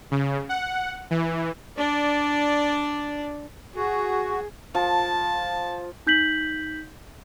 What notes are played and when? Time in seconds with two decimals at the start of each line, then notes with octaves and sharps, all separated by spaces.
0.11 C#3
0.49 F#5
1.11 E3
1.77 D4 D5
3.76 F#4 G#4
4.75 F3 A5
6.07 D#4 G6 B6 F#7